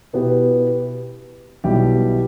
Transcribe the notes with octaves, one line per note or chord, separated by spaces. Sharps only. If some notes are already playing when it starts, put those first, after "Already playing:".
B2 B3 E4 G4 B4
B1 B2 G3 E4 G4